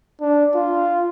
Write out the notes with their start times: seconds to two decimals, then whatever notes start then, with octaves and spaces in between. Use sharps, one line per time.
0.21 D4
0.55 F4